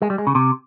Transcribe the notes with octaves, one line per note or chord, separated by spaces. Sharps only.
G#3
G3
G#3
C#3
C3